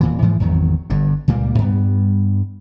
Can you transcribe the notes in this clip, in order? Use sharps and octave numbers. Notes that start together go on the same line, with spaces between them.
D#1 A#2 E3
G#2 E3 F3 G#3
G#1 E2 D#3 F#3
G1 G2 D3
C#2 A#2 G3 A#3
G2 G3 B3